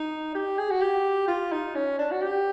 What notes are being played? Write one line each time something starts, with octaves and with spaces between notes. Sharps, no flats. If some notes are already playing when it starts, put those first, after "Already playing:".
Already playing: D#4
G4
G#4
F#4
G4
F4
D#4
C#4
D4
F#4
G4